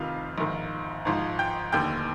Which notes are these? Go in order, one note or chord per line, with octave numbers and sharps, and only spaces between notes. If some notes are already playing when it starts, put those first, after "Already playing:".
Already playing: F1 F2 C3 D#3 F4 F5
A#1 G#2 D#3
G#1 G#2 F3
G5 G6
F1 D#2 D3 G5 G6